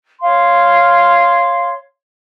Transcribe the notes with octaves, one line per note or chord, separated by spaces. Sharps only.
C#5 F5 C6